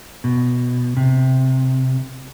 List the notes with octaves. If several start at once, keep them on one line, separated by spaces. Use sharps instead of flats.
B2
C3